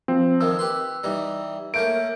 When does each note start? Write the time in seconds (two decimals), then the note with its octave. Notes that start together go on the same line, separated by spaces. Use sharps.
0.08 F3 C4
0.41 F2 D#3 F3 E6
0.59 G4 B4 C6
1.03 E3 G3 D#4
1.74 A3 A#3 C#4 G6 D7